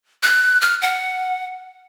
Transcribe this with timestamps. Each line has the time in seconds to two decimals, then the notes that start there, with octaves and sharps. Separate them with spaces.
0.23 F#6
0.61 F6
0.82 F#5